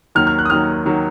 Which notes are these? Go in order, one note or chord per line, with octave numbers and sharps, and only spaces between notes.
D#2 D#3 F#3 F6
F6
F#6
D#6
D#2 D#3 F#3 F6
D#3 F#3